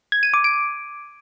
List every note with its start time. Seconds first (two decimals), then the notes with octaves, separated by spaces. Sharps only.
0.12 G#6
0.23 D#7
0.34 D6
0.44 D7